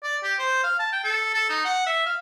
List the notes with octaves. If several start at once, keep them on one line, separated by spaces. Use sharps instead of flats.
D5
G4
C5
F5
A5
G5
A4
A4
D#4
F#5
E5
F5